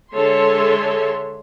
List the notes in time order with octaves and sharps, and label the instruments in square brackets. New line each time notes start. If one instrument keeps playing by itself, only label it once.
[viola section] D3 G#3 A4 C#5 E5 C6